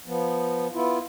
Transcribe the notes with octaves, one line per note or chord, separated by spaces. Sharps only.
F3 B3
B3 E4 F4